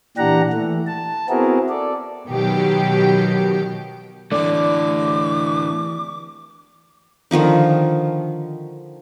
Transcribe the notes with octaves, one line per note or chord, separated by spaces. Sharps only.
A#2 E3 D4 G4 F#5 A#5
E3 A3
A5
B3 C4 E4 F#4 G#4 A#4
A4 D5
B2 D#3 F#3 G4
A2 D3 E3 A3 D5 D6
D3 D#3 F3 D#4